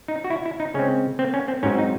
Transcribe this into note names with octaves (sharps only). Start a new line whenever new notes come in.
D#4
F#4
E4
E4
D#4
C#3 G#3 C4 C#4
C4
C#4
C4
G#2 F#3 C4 C#4
D#4